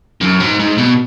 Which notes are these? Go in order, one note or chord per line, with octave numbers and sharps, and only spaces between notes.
F#2
G#2
G#2
B2